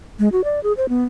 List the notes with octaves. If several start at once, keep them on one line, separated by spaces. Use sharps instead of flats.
G#3
F#4
D5
G#4
C5
B3